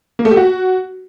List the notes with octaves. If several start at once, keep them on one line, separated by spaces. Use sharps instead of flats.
A#3
A3
G4
F#4